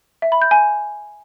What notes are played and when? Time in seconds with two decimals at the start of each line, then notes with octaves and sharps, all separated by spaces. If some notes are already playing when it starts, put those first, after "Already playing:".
0.22 E5
0.32 B5
0.42 G6
0.51 G#5